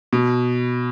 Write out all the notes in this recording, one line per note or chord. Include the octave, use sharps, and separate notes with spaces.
B2